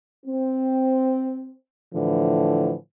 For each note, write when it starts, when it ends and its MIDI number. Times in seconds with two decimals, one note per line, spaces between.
0.26 1.56 60
1.94 2.74 45
1.94 2.74 50
1.94 2.74 52
1.94 2.74 53